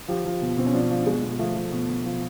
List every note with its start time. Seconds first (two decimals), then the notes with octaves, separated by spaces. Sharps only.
0.08 F3 G4
0.25 F3
0.41 B2
0.57 B2 C4
0.67 C#4
0.74 F3 D4
0.90 F3
1.06 B2 G#3
1.23 B2
1.39 F3 A3
1.55 F3
1.72 B2
1.89 B2
2.05 F3